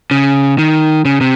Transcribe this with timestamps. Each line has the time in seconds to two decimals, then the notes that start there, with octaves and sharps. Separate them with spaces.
0.11 C#3
0.58 D#3
1.05 C#3
1.21 C3